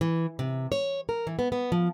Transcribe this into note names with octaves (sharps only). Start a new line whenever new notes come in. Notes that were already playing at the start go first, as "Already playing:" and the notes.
E3
C3
C#5
A#4
E3
B3
B3
F3